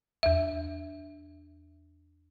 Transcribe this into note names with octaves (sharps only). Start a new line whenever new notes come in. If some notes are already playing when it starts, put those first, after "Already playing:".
E2 E5